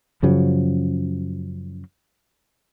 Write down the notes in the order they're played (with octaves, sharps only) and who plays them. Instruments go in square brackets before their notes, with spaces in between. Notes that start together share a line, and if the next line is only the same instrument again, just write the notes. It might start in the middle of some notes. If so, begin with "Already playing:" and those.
[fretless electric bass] F#2 C#3 F3 F#3